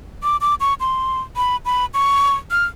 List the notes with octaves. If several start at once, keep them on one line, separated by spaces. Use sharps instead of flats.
D6
D6
C#6
C6
B5
B5
C#6
F6